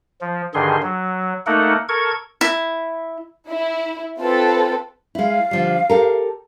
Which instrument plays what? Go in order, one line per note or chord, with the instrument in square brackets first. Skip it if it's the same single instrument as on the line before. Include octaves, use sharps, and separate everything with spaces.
[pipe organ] F3
G2 D3 D#3 G#4 C6
F#3
A3 A#3 D#4 A4 A#4 F#5
A4 A#4 C#6 G#6
[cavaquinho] E4
[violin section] E4
C4 F4 A4 B4
[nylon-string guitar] G#3 E4 [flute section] F5
[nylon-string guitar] D3 F3 G3
G4 A4 A#4